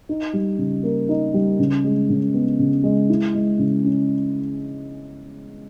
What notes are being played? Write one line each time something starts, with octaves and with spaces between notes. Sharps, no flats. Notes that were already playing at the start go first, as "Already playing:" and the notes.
D#4
G3
C#3
A#3
D#4
G3
C#3
G#3
C#3
B3
C#3
G#3
E4
G#3
C#3
C#4